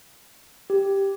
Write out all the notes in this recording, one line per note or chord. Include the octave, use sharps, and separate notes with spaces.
G4